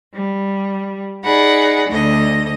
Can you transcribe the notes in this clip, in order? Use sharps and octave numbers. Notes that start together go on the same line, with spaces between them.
G3
D#4 G#4 D5 F#5 B5
D2 D3 D#5